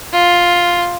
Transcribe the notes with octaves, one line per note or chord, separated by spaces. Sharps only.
F4